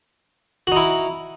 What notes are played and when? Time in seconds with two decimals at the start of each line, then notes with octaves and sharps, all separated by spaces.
0.67 F#4
0.72 D#4
0.76 E4